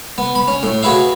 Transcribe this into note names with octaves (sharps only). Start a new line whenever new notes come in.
B3
B5
C#4
A2
F#4 G#4 B4 E5 F5